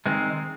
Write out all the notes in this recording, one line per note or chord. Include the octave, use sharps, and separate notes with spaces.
D#3 G#3 C4